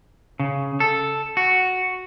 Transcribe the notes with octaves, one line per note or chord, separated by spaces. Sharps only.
C#3
A4
F#4